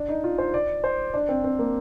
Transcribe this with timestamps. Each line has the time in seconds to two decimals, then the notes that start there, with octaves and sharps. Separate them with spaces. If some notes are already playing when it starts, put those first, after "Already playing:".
Already playing: D4
0.09 D#4
0.24 F4
0.38 C5
0.54 D5
0.84 C5
1.14 D4
1.29 C4
1.44 C4
1.59 A#3